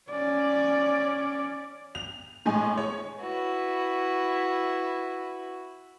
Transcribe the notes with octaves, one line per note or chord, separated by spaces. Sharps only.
C#4 D5
F7
A2 G#3 G#5
C#5
E4 F#4 B4